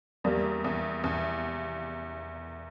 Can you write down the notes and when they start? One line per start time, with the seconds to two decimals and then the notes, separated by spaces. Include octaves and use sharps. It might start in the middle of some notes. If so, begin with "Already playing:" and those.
0.24 E2 G3 A#3
0.64 E2
1.04 E2